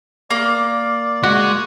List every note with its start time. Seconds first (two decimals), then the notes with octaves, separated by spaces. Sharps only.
0.31 A#3 D5
1.23 G#3 F#4